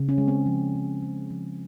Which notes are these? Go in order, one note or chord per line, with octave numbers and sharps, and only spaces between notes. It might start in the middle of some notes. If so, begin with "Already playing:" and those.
Already playing: C#3
C#4
G#3
C4
F3
C#3
G#3
F3